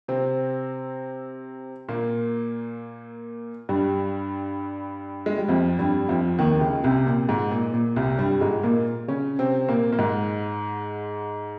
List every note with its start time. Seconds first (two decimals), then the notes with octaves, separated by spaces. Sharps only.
0.08 C3 C4
1.89 A#2 A#3
3.69 G2 G3
5.26 G#3
5.38 G3
5.48 F2 F3
5.79 G2 G3
6.09 F2 F3
6.39 D#2 D#3
6.61 C#2 C#3
6.84 C2 C3
6.97 C3
7.06 A#2
7.29 G#2
7.52 A#2
7.74 A#2
7.96 C2 C3
8.18 G2 G3
8.41 G#2 G#3
8.63 A#2 A#3
9.08 C#3 C#4
9.39 C3 C4
9.69 A#2 A#3
9.93 A#3
9.99 G#2 G#3